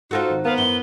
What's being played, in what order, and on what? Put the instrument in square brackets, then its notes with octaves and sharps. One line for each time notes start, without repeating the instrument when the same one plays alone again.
[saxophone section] D#4 F4 A4 [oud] F#4 A#4 C5
[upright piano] G#1
[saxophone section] B3 [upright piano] A#4 C5 [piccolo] F5
[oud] F#2 E4 [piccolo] G7